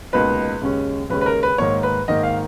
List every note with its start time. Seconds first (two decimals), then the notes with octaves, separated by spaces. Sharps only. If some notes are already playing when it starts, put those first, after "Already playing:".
0.13 C#2 B2 A#3 D#4 B4
0.62 D#2 C#3 G#3 C#4
1.10 D#2 C#3 G#3 C#4 B4
1.21 B4
1.26 A#4
1.43 B4
1.58 G#2 D#3 A#3 C#5
1.83 B4
2.08 G#2 D#3 A#3 D#5
2.23 F5